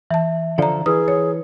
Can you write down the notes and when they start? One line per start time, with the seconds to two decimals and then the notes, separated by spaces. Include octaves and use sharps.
0.11 E3 E5 A5
0.58 D3 F3 A4 D5 A#5
0.86 E3 G#4 B4 D#6
1.08 C#5